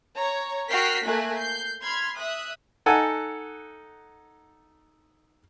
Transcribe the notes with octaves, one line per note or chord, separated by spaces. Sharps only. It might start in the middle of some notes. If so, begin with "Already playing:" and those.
C#5 A#5
F#4 A#4 G5 F6 B6 C7
A3 A#3 G#5 F#6
G6 C7
B5 C6 F6 G#6
E5 D#6 F#6
D#4 A4 F#5 G#5